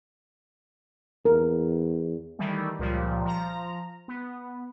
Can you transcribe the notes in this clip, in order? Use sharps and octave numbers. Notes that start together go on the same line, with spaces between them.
E2 A#4
D#3 E3 G3 A3
C#2 A#2 F3 G3
F3 A#5
B3